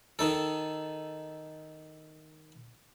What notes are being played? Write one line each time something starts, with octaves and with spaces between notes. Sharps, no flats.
D#3 D#4 A4